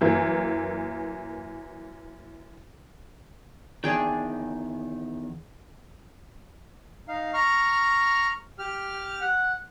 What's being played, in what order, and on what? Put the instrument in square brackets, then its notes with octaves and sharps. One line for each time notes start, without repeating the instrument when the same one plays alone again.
[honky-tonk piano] F#2 E3 A#3
[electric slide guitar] E2 G#2 D#3 [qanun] D4 G#4 G5
[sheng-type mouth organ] D#4 F5
A#5 C#6 F6
G4 F6
F#5